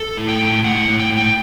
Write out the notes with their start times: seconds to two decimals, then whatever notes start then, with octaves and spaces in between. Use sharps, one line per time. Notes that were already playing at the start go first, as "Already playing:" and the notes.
Already playing: A4
0.17 A2
0.28 G5
0.41 A2
0.64 A2 F#5
0.88 A2
1.00 G5
1.10 A2
1.17 G5